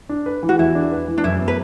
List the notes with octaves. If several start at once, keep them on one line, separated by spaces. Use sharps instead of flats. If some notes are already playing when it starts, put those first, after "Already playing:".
D4
B4
E3
F#4
E2 E4
D4
B4
E3
D4
F#2 E4
B3
B4